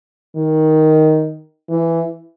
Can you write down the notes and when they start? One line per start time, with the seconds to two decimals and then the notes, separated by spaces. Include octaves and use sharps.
0.36 D#3
1.69 E3